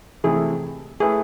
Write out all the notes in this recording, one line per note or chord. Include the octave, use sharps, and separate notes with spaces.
C3 E3 A3 E4 G#4
A3 E4 G#4 B4